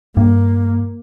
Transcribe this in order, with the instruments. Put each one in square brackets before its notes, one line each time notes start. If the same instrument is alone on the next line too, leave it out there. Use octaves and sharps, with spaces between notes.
[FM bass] G2 [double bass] A#3